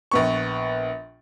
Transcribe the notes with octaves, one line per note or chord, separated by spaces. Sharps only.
A#1 B3 C#6